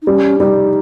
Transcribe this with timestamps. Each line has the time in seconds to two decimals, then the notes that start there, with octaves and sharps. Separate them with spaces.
0.02 D#4
0.07 G3 C#4
0.39 G3 D#4